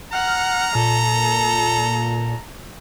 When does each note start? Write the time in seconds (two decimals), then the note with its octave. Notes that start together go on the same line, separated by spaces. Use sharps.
0.13 F#5 A#5 F6
0.75 A#2 A4